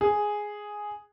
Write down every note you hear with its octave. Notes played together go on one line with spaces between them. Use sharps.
G#4